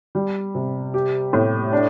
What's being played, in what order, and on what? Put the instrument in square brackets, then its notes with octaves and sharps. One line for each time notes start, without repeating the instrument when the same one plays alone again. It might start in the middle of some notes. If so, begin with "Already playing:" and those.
[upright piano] G3
C3
G4
A2
D4